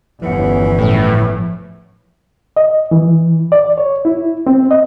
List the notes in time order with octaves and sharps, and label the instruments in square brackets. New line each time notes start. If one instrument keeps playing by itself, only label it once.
[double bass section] G1 E2 C#4 [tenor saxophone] E3 [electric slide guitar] F3 F#5
[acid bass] A2
[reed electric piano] D#5
E3
D5
C#5
E4
C4
D#5